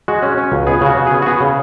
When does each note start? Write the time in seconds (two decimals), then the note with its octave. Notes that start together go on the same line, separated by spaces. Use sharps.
0.08 G#3 F#4
0.23 C#4
0.38 C#4
0.52 C#2
0.67 B3 G#4
0.81 C#3
0.86 F#4
0.97 C#3
1.07 B3 G#4
1.22 F#4
1.26 B3 G#4
1.41 C#3